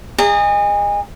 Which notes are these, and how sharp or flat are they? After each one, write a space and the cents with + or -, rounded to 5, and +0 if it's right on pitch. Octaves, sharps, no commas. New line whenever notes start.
G#4 -30 D#5 -20 A#5 -45